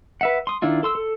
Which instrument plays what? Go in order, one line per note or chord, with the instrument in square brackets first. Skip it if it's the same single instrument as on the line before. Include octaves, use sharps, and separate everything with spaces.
[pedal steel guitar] B4 E5 F#5
C6 D#6
D#3 D4 E4 F4
A4 C6 E6
A4